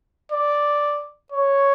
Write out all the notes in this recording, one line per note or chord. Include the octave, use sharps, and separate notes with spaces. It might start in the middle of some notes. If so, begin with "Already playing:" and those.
D5
C#5